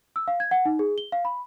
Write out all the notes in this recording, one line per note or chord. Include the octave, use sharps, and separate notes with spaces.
E6
F5
G#6
F#5
D#4
G#4
G7
F5
B5